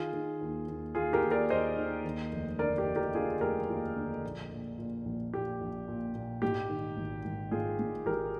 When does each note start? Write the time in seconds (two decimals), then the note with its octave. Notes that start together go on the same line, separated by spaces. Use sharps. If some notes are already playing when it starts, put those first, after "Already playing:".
Already playing: D#3 F4 G#4
0.13 D#3
0.41 D#2
0.68 D#2
0.95 D#2 F4 G#4
1.13 G4 A#4
1.23 D#2
1.31 A#4 D5
1.50 D#2 C5 D#5
1.77 D#3
2.05 D#2
2.32 F1
2.59 D3 A#4 D5
2.77 G4 A#4
2.87 F1
2.96 G4 A#4
3.14 D3 F4 G#4
3.41 F1 G4 A#4
3.69 D#2 F4
3.96 D3
4.24 A#1
4.51 A#2
4.78 A#2
5.06 A#1
5.33 A#2 G4
5.61 A#1
5.88 A#2
6.15 A#2
6.42 G#2 G4
6.69 D#3
6.97 G#1
7.25 G#1
7.51 G#2 F4 G#4
7.79 G#2
8.06 G#1 G4 A#4